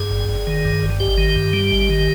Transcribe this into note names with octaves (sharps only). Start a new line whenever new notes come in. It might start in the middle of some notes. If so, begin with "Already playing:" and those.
Already playing: G2 G#4
G1
G1
D#3
G2
G1
G#1 G4
D#3
G2
G3
G#1
D#3